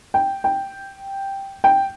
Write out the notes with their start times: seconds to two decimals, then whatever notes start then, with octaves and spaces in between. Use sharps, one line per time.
0.14 G5
0.44 G5
1.64 G5